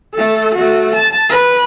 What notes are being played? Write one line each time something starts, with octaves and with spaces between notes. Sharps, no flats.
A3 A4
A3 F#4
A5
B4